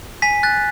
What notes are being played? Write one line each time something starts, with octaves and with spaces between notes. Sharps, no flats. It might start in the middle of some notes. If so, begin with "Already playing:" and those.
G#5 B6
F#6 A6